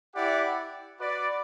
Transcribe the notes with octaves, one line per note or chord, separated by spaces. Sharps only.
E4 G4 D5 F#5
F#4 B4 D5